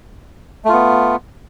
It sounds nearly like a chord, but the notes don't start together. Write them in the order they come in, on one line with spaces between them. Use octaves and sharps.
A3 F4 B3